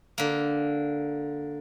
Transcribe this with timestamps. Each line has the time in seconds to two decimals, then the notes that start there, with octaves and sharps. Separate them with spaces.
0.18 D3 A#3